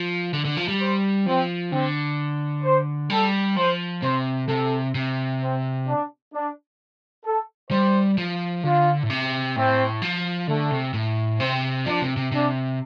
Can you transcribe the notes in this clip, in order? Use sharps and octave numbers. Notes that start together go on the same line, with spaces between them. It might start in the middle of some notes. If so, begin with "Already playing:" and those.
Already playing: F3
D3
D3
F3
G3
C5
F3 C4
D3 C4
C5
G3 A4
F3 C5
C3 C5
C3 A4
C3
C4
D4
D4
A4
G3 C5
F3
D3 F4
A2
C3
A2 C4
F3
D3 A3
C3
A2
C3 C4
F3 D4
C3
C3
C3 D4